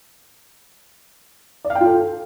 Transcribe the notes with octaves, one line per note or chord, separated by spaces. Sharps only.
D5
F5
G5
F4
A4